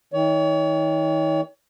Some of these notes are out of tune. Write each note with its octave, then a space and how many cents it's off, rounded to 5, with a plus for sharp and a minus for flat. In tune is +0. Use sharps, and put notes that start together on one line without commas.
D#3 +40 C#5 +35